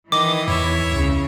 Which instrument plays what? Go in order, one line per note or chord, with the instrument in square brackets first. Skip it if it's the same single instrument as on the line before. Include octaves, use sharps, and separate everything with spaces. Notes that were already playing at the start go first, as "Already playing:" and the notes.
[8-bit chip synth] D#3 D#5 [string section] E3 [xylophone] D6
[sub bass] E2 [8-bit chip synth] E4 C#5 E5
[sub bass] C#2 [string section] C#3